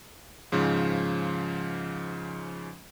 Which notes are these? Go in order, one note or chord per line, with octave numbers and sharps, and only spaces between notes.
G#2 C#3 F3